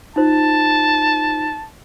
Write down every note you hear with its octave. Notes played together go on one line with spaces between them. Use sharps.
D#4 F4 C5 A5